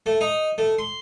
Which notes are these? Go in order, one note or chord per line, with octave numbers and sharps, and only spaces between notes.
A3
D#4
A3
C6